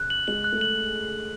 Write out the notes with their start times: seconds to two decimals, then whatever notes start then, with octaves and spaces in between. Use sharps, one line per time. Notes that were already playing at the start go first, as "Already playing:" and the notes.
Already playing: C#3 F#6
0.10 F#7
0.28 G#3 F#7
0.44 F#6
0.53 A3
0.61 F#7